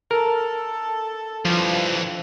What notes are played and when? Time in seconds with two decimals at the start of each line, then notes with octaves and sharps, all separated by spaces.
0.11 A4 A#4
1.45 G2 E3 F3